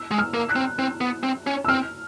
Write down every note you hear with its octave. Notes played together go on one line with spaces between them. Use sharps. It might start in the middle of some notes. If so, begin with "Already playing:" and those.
Already playing: E6
G#3
F6
A#3
F#6
C4
C4
B3
C4
C#4
E6
C4 F6